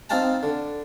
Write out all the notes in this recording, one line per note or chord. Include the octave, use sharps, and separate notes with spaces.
C4 D#4 F4 G5 A5 A#5
D3